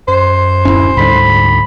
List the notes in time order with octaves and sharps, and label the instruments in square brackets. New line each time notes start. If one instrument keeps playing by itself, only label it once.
[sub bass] F#2 [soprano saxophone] C5
[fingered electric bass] D1 G1 C#4 [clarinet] E4
[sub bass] D2 [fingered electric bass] G#2 D3 G3 [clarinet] B5